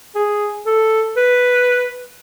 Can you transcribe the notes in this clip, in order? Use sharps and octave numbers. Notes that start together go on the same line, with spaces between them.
G#4
A4
B4